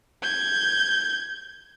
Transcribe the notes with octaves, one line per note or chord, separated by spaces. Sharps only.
G6 G#6